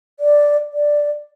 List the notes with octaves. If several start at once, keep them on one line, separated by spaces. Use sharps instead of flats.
D5
D5